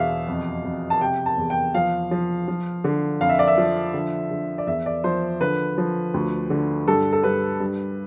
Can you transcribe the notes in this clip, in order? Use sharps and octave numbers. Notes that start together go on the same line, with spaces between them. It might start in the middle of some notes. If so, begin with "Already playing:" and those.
Already playing: E2 B2 E5 F5
F2
F2
A5
C3 G5
A5
E2
G5
F3 F5
F3
F3
D3
F2 F5
E5
D5
E5
F3
D3
D3
D5
E2 E5
D5
F3 C5
D3 B4
F3
D2
D3
G2 A4
A4
G2 B4
G2